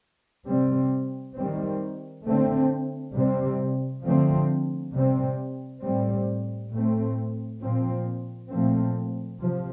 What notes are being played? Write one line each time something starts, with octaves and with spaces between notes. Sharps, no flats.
C3 G3 C4
D#3 G3 C4
D3 A3 C4
C3 G3 C4
D3 F3 A3 C4
C3 G3 C4
A2 G3 C4
A2 A3 C4
A#2 F3 C4
A#2 F3 A3 C4
C3 F3